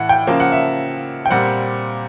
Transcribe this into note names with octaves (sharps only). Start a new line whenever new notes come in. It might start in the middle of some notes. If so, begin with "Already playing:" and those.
Already playing: A2 E3 F#5
G5
C#3 F3 A#3
F#5
E5
G5
A#2 G3 C4 F#5